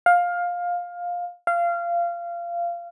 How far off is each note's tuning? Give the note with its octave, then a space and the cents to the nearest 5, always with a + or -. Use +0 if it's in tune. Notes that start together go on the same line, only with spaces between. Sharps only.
F5 +15
F5 -20